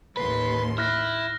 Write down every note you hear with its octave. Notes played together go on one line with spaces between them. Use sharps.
A1 D#2 B4 C6
E4 F6 F#6 A#6